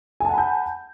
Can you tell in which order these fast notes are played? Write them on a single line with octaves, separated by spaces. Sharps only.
G#5 A5 F#5 B5 G6